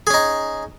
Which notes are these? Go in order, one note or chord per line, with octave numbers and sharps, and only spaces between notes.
C#4 D#4 G#4